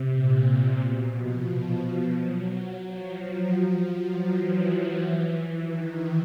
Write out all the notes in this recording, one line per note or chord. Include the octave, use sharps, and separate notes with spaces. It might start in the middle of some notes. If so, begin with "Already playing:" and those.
Already playing: C3
A#2
B2
F3
F#3
F3
F3
F3
F#3
E3
D#3